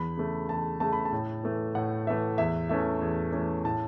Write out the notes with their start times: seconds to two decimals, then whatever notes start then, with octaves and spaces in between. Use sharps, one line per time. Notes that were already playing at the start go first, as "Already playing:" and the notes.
Already playing: E2 B5
0.17 C#3 A3
0.49 E2 A5
0.80 C#3 A3 A5
0.93 B5
1.05 A5
1.12 A2
1.43 E3 A3
1.75 A2 F#5
2.07 E3 A3 E5
2.38 E2 E5
2.69 E3 A3 C#4 E5
3.02 E2
3.32 E3 A3 C#4
3.65 A2 A5